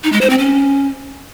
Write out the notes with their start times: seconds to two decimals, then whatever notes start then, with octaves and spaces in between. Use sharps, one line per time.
0.04 D#4
0.12 G#3
0.21 C5
0.30 C4
0.38 C#4